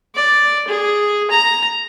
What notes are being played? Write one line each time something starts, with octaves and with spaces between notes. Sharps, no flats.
D5
G#4
A#5